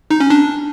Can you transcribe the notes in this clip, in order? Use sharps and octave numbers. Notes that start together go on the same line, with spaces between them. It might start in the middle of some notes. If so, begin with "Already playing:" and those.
D#4
C#4
D4